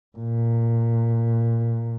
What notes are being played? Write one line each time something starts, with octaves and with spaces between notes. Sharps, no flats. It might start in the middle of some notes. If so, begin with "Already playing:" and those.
A#2